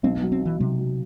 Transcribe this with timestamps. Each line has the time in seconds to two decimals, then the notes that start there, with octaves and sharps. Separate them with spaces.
0.03 B1 C4
0.17 F#3 B3
0.32 C4
0.42 E3 F#3
0.59 B1 C3
0.79 F#3